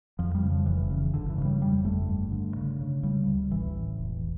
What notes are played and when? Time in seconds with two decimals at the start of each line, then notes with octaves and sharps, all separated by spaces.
0.19 F2 F3
0.35 G3
0.43 C#3
0.50 F3
0.66 F1 E3
0.90 C#3
1.14 G1 D3
1.30 E3
1.38 C#3
1.45 G3
1.61 F2 G3
1.84 G1 A3
2.09 G2
2.32 D3
2.57 C#3
2.81 C#3
3.03 C#3 G3
3.27 D2
3.51 A1 E3
3.74 A1
3.98 E1